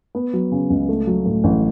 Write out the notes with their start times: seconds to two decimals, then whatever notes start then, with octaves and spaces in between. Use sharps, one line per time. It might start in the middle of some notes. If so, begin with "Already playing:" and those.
0.15 B3
0.33 F#3
0.52 C#3
0.70 C#2
0.89 A3
1.07 F#3
1.26 A2
1.44 A1